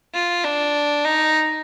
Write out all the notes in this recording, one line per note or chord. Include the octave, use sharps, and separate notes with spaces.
F4
D4
D#4